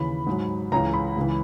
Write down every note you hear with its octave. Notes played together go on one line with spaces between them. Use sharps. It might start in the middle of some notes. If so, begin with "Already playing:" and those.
Already playing: D#2 C#3 E3 B5
G#2 F#3
C#2 C#3 E3 A#5
B5
C#2 C#3 E3